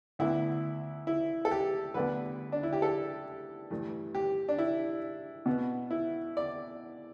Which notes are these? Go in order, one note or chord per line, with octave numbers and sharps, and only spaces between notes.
D2 D3 B3 E4
E4
A4
G4
D2 D3 G3 B3 B4
D4
E4
G4
A4
G2 E3 A3
G4
D4
E4
B2 B3
E4
D5